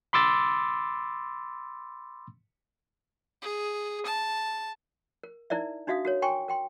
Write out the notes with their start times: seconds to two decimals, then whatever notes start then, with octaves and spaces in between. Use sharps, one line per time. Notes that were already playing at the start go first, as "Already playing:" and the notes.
0.13 B5 C6 D6 E6 A6
3.42 G#4
4.05 A5
5.23 A#4
5.50 D#4 E4 A#4 D5 E5
5.87 D4 D#4 F#4 E5 F5 D#6
6.05 F#4 A#4 C#5
6.22 A#4 G5 G#5 C6 C#6
6.48 A#4 G5 C6